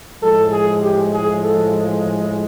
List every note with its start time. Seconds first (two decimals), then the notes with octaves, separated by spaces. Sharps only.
0.22 A2 F3 G#3 A4
0.51 G#4
0.82 G4
1.13 G#4
1.42 A4